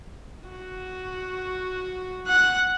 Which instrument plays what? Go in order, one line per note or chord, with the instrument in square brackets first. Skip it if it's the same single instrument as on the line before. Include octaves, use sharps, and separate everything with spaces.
[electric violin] F#4
F#5 F#6